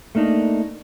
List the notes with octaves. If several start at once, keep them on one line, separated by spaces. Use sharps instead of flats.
A3 A#3 D4 D#4